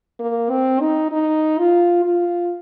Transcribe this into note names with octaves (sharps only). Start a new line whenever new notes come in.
A#3
C4
D#4
D#4
F4
F4